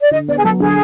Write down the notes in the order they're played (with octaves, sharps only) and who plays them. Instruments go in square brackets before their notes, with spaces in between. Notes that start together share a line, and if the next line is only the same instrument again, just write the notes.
[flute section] D5
[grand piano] D3 [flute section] D#5
[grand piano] B3 [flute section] D5
[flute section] G#4
[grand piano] F#3 [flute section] A4
[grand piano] D3 [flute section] G#4